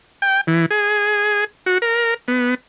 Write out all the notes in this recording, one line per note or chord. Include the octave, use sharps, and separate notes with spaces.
G5
E3
G#4
F#4
A#4
B3